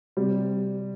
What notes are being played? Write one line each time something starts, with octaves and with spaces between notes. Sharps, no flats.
C3 G3 C4